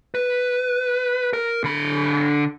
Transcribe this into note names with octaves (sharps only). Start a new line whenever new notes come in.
B4
A#4
D3 B5